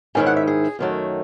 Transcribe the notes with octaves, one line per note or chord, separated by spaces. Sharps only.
G#2 D#3 F#3 C#4 E4 G#5
F#5
E5
G#4
F#2 D#3 F#3 A3